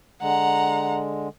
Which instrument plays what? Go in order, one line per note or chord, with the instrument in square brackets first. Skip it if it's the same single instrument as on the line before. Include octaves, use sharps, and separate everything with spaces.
[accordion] D3 G#3 [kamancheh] F#5 A#5